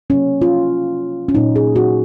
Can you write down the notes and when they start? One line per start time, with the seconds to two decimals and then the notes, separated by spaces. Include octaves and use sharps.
0.10 C3 F#3 A#3 C#4
0.42 F4
1.29 C#4
1.35 A#2 F#3 A#3 D#4
1.56 G#4
1.76 F#4